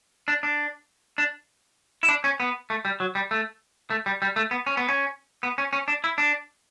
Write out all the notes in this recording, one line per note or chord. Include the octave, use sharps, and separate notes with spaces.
D4
D4
D4
E4
D4
C#4
B3
A3
G3
F#3
G3
A3
A3
G3
G3
A3
B3
C#4
B3
C#4
B3
C#4
C#4
D4
E4
D4